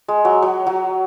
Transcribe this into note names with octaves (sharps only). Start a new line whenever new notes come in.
G#3
F#3
F#3
F#3